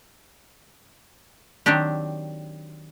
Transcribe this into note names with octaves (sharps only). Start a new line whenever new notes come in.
D#3 F#3 C4 D4 G4